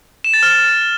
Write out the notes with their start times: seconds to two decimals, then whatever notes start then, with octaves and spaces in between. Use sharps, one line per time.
0.24 E7
0.34 A6
0.43 F6